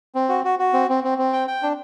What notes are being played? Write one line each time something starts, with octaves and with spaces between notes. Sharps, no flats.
C4
F#4
F#4
F#4
C4
C4
C4
C4
G5
G5
D4